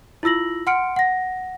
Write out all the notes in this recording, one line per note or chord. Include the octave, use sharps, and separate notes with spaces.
E4 F4 E6 A#6 F#7
F#5 C6 F6 C#7 D7
F#5 A#6